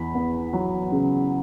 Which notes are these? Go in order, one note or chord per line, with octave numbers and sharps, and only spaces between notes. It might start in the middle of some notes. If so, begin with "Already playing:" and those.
Already playing: E2 B5
B3
F#3
C#3